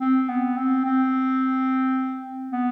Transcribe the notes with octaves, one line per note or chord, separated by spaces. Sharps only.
C4
B3
C4
C4
B3